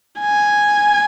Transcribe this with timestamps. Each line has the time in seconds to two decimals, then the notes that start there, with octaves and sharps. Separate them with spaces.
0.21 G#5